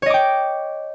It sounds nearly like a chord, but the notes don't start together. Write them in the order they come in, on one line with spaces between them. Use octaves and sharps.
C#5 D#5 D6 G5